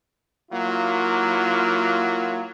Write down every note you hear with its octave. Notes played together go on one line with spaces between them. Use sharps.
F#3 A#3 E4 F4